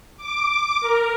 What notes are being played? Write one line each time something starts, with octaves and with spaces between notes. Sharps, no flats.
D6
A#4